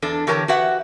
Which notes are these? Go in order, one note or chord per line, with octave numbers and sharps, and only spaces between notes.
E2 D4 A4
D3 E3 G4 A#4 C#5 A5
F#4 G4 B4 E5 F#5